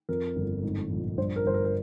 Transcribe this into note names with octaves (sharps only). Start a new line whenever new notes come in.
F2 A#4
G1
G#2
A#1
G2 C5
A#4
G1 C5
A#4
A#4